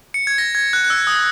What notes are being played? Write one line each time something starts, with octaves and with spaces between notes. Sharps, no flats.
C#7
G#6
A#6
G#6
F#6
F#6
E6
D#6